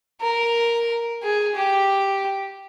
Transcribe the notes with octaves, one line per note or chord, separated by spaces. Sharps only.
A#4
G#4
G4